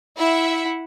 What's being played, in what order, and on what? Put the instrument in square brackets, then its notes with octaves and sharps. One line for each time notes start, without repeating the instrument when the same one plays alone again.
[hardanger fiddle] E4 F#5 [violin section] E5